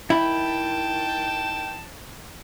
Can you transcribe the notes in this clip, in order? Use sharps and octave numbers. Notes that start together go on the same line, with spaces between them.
D#3 E4 G5 A5